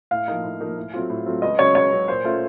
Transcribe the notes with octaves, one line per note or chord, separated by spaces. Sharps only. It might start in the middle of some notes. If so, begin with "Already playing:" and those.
A2 F5
F3 A#3 D#4
A2
F3 A#3 D#4
A2
F#3 A3 C4 F4
A2
F#3 A3 C4 F4
C#2 D#5
C#3 F#3 C#5
C#2 C#5
C#3 F#3
A#2 C5
A3 C#4 F4